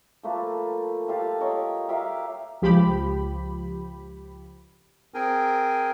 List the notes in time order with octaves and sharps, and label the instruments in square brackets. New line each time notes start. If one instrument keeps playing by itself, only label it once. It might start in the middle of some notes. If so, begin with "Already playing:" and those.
[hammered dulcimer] F3 A3 A#3 B4
F4 G4 A4 F5
A#4 C#5 D#5
G4 A#4 E5 F5
[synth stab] C#2 F3 G4 B5
[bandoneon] C4 G#4 A#4 G5 G#5